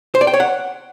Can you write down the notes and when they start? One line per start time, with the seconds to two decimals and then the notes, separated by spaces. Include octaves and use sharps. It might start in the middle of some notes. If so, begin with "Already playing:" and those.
0.15 C5
0.21 D5
0.27 G5
0.34 C#5
0.40 F#5